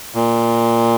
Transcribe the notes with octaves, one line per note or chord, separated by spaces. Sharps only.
A#2